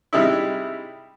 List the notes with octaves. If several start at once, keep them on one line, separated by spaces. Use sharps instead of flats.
C3 G3 G#3 D#4 E4